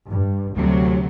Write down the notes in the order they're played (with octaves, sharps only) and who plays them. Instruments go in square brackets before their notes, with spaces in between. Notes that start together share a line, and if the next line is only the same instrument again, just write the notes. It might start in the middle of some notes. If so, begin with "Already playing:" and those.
[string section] G2
D2 C3 F#3